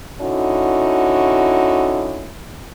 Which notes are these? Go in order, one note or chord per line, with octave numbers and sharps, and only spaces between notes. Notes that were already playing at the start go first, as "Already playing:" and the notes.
D3 C#4 D#4 E4 F#4